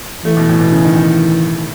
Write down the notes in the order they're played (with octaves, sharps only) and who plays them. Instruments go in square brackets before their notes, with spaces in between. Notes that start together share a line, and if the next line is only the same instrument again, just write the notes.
[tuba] E3 [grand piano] A3
[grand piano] B2
A2
B2
C#3
D#3
D#3